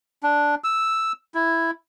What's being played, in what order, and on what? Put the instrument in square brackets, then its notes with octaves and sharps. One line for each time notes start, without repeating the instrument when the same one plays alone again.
[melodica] D4
E6
E4